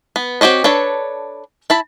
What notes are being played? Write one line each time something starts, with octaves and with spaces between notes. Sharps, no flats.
B3
C4 F#4 G4 C#5 D#5
D4 A4 B4 C#5
E4 A5 B5